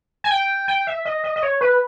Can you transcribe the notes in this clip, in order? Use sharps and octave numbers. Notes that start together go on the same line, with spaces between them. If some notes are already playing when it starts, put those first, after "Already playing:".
G#5
G5
G5
E5
D#5
D#5
D#5
C#5
B4